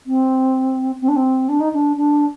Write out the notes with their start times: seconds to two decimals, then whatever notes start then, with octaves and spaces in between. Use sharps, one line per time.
0.06 C4
1.01 C4
1.08 D4
1.16 C4
1.48 D4
1.60 D#4
1.73 D4
1.96 D4